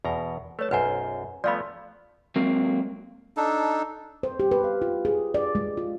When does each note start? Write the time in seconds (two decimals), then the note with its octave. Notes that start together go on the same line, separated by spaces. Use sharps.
0.05 E2 B2 A#5
0.59 A3 B4 C#5 A5
0.71 B1 F#2 B4 C5 F#5 G#5
1.44 F3 A3 B3 D5 F5 B5
2.36 F#3 G#3 A#3 C4
3.37 D4 D#4 A4
4.23 C5
4.40 G4
4.51 B4
4.64 F5
4.82 F4
5.05 G#4
5.34 D5
5.55 G#3
5.77 F4